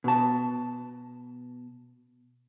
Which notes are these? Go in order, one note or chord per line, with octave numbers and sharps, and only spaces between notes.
B2 A5